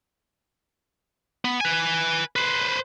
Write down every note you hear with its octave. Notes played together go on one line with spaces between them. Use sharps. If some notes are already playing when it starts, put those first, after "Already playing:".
B3
B4 G#5
B4 C5